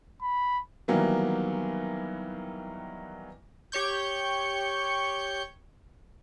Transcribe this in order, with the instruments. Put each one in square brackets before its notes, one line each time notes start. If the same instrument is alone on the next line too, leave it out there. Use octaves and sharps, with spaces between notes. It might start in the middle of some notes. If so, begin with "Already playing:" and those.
[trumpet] B5
[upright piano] D#3 E3 F#3 G3 A#3 B3
[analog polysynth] G4 C#5 C#6 G6